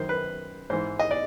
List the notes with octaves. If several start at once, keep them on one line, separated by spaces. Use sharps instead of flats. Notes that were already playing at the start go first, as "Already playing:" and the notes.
Already playing: F#2 D#3 C5
B4
G#2 E3 C5
D#5
D5